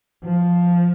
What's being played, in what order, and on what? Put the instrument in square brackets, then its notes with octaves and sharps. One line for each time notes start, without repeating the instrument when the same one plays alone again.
[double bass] F3